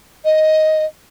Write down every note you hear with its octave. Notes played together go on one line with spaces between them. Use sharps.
D#5